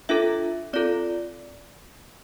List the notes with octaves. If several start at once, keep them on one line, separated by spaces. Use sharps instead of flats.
D4 F4 A4 E5
C4 F4 A4 D5